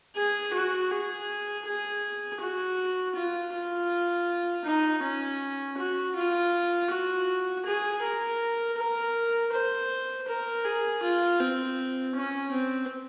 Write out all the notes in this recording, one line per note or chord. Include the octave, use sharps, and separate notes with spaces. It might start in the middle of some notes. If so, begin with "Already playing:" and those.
G#4
F#4
G#4
G#4
F#4
F4
F4
D#4
C#4
F#4
F4
F#4
G#4
A#4
A#4
C5
A#4
G#4
F4
C4
C#4
C4